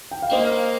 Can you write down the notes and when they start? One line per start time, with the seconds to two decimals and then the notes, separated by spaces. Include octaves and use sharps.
0.11 G5
0.22 F5
0.31 A#3 C5 D#5